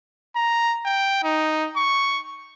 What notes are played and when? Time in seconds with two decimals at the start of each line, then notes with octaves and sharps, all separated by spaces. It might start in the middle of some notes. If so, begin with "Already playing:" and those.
0.36 A#5
0.86 G5
1.23 D#4
1.76 C#6